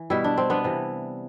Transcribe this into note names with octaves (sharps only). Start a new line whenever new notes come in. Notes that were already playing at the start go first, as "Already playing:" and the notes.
Already playing: E3
B2 G3 E4
D4
C4
B3 D4
C3 E3 G3